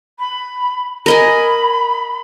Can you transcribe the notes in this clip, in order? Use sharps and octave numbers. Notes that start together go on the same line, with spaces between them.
B5
A#4 D#5 G#5 B5